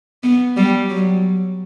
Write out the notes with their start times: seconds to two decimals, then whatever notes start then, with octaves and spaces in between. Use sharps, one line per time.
0.24 B3
0.57 G3
0.90 F#3